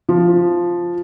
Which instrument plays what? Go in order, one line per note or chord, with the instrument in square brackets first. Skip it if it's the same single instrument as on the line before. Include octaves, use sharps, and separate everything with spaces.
[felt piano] F3